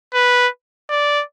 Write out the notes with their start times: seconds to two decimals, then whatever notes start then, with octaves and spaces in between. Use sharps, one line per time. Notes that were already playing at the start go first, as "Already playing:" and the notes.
0.13 B4
0.89 D5